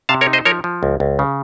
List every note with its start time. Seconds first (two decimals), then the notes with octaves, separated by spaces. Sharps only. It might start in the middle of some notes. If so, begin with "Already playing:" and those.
0.09 C3 F5 A5
0.21 A#4 C#5
0.27 D#4
0.33 C5 D#5
0.45 F3 A#4 C#5
0.64 F3
0.83 C#2
1.00 C#2
1.19 C#3